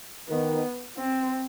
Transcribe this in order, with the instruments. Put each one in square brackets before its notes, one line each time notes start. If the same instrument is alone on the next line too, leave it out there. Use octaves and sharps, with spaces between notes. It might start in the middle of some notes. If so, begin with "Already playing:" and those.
[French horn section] D#3 [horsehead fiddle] B3
[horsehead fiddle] C4